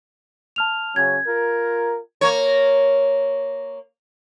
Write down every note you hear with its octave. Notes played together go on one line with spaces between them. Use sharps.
A5 F6 F7
C#3 F#3 C#4 G#6
F4 A#4
A#3 C#5